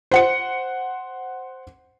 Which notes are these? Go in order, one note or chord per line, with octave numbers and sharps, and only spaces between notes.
C5 F#5 C#7